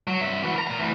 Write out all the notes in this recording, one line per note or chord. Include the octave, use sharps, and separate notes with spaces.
F#3
G2 E5
E3 F#4
A#4 A#5
A#2 A#5
D2 E3